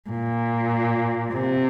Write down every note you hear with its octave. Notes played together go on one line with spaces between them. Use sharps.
A#2
C3